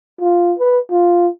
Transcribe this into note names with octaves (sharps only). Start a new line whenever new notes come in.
F4
B4
F4